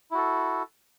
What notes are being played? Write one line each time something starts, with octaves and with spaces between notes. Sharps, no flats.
E4 F#4 A4